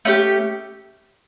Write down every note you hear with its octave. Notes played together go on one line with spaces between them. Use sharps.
A3 C#4 G4